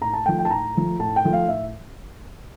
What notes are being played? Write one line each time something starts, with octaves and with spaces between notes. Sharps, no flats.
A2 A#5
A5
F3 A3 G5
G5
A5
A2 A#5
F3 A3
A2 A5
G5
F3 A3
F5
A2 E5